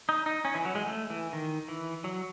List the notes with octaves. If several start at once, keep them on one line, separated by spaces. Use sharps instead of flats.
D#4
D#4
C#4
E3
F#3
G#3
A3
E3
D#3
E3
F#3